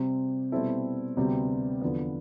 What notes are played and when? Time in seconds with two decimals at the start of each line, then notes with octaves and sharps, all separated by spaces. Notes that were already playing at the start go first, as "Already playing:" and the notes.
Already playing: C3 G3 C4 G4
0.52 B2 G3 C4 E4 A4
1.16 D2 C3 G3 B3
1.81 E2 D3 F3 B3